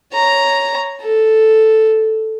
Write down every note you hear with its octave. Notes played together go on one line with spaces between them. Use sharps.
C#5 A#5
A4